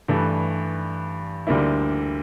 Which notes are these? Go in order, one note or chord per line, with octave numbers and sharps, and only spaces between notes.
G2 E3 A3
D2 D3 G3 A#3 E4